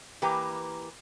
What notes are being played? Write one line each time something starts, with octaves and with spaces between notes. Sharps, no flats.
E3 A#3 G4 A#4 B4